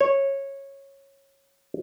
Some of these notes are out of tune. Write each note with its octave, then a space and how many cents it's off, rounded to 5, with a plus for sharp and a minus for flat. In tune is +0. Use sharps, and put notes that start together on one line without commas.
C#5 -15